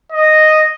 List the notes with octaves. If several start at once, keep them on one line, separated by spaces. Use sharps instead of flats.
D#5